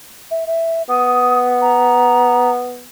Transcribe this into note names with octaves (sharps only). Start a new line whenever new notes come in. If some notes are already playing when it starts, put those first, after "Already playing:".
E5
E5
B3 D#6
A#5